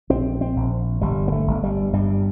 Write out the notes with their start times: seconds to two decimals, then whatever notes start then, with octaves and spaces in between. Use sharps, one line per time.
0.10 A#1 C4
0.41 C4
0.56 A#1
1.01 G1 G3
1.28 A#3
1.32 A3
1.47 G1
1.63 G3
1.93 G2 G3